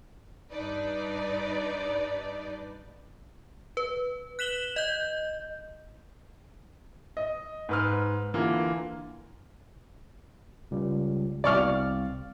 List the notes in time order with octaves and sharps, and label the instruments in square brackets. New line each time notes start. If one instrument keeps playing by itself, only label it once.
[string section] G2 D4 D#4 B4 D5
[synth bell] B4
F#6 B6 E7 F#7 G7
D#5 G6
[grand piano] D#5
G#2 B4 F6
D3 E3 A#3 F4
[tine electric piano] C#2 G3
[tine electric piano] C2 C4 F5 [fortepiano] D5 C#6 F6